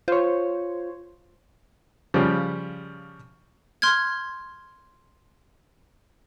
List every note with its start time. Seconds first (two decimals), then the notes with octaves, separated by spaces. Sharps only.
0.08 F4 C5 C#5
2.14 C#3 F3 G3
3.82 C6 F6 G6 G#6